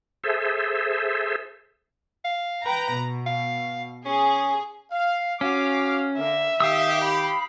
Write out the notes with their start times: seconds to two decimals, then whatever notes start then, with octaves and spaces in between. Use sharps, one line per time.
0.24 G#4 A4 C5 E5
2.24 F5
2.65 B4 G5 A#5
2.95 B2
3.26 F5
4.05 C#4 G#4
4.92 F5
5.41 C#4 F#4 F5 D6
6.17 D3 A#3 E5
6.60 D#3 G4 F5 D#6 E6
7.03 B5